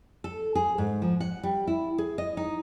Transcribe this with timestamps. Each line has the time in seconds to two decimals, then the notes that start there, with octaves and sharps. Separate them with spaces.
0.24 A4
0.55 G#4
0.78 G#2
1.02 F3
1.20 F#5
1.43 G3
1.67 E4
1.98 G#4
2.18 D#5
2.37 D#4